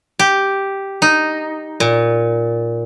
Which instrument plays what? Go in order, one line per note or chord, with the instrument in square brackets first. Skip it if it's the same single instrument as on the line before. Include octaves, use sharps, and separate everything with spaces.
[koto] G4
D#4
A#2